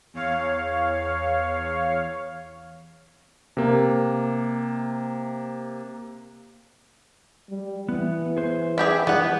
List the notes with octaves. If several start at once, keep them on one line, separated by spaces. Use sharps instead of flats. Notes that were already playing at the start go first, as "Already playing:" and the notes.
E2 C#5 F5
C3 A#3
G3
E3 B3
G#4 C5
E4 G4 G#4 E5
E3 G3 B3 F#5